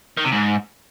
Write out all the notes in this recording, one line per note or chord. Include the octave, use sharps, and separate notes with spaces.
D#3
C3
G#2